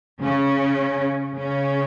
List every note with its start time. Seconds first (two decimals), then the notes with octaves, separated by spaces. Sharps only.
0.21 C#3 C#4
1.37 C#3 C#4